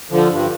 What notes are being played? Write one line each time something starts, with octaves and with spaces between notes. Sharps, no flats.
D3 F3
G2